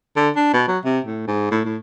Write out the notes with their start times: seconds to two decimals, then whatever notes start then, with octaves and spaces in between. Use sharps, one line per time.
0.16 D3
0.36 D4
0.53 B2
0.68 F#3
0.85 C3
1.05 A2
1.28 G#2
1.51 A2
1.65 A2